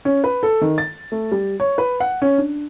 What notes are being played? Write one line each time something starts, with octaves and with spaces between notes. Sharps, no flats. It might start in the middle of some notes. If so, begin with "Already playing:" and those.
C#4
B4
A4
D#3
A6
A3
G3
C#5
B4
F#5
C#4
D4